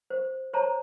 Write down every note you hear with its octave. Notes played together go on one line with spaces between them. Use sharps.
C5
C5 C#5 A5 A#5